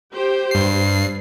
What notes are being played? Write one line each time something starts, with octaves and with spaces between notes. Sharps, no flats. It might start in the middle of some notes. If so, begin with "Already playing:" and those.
G4 C5
G2 C7